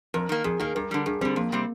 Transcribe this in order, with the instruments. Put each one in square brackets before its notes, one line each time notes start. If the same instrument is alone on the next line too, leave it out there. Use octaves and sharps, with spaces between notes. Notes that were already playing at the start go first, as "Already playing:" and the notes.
[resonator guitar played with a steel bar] F2 [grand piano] A#4
[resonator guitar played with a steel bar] D#3 A#3
[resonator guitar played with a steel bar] F2 [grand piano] G#4
[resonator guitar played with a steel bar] D#3 A#3 [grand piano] G#4
[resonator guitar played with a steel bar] G2 [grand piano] A#4
[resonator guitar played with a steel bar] D3 G3
[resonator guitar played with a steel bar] G2 [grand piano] G#4
[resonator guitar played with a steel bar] D3 G3 [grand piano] C4
[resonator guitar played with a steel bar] F2 [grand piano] A#3
[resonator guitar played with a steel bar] C3 G3 C4